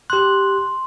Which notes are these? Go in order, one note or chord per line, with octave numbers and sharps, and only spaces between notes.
G4 C6 F#6